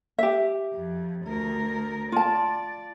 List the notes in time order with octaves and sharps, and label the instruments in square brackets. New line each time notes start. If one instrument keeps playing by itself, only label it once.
[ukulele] G4 E5
[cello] F2
D2 A#4
[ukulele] F4 A5 [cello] D5